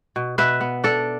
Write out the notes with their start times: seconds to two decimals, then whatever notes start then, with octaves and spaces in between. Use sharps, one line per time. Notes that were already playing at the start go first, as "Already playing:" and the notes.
0.16 B2
0.38 B2 B4 E5
0.61 B3
0.84 D4 A4 D5